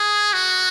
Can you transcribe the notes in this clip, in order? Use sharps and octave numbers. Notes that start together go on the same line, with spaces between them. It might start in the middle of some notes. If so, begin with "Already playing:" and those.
Already playing: G#4
F#4